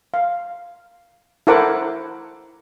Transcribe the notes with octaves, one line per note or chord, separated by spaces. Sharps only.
F5
E4 A4 A#4 C5 F#5 D6